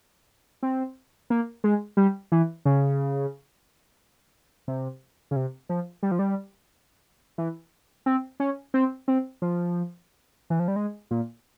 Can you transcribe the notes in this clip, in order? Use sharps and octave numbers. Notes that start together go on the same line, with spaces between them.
C4
A#3
G#3
G3
E3
C#3
C3
C#3
C3
F3
G3
F3
G3
E3
C4
C#4
C4
C4
F3
E3
F3
G3
G#3
A#2